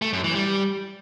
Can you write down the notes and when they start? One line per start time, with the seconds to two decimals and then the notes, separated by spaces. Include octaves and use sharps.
0.02 A3
0.13 F#2
0.24 E3
0.35 G3